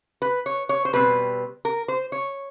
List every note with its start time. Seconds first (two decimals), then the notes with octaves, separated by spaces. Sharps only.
0.22 B4
0.46 C#5
0.69 C#5
0.85 C5
0.93 B2 G3 C4 B4
1.65 A#4
1.88 C5
2.12 C#5